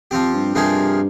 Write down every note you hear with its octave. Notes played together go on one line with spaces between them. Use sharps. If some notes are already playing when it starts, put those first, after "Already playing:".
F2 F3 C4 G4
G2
G2 C3 F3 A#3 D#4 G#4